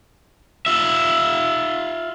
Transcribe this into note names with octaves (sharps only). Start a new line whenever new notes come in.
F4 E5